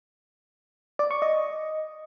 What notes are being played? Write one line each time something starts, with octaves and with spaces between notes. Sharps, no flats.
D5
C#6
D#5